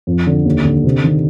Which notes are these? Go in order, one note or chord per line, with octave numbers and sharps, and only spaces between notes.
F2
D3
D#2
D3
C3
D#3